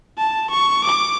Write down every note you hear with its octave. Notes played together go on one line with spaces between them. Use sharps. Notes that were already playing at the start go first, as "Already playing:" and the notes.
A5
C#6
D6